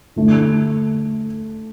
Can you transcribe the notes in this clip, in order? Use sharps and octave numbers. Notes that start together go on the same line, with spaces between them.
D3 A3